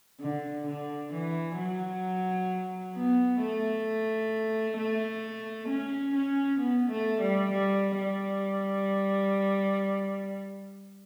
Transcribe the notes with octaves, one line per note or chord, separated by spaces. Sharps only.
D3
D3
E3
F#3
B3
A3
A3
C#4
C#4
B3
A3
G3
G3
G3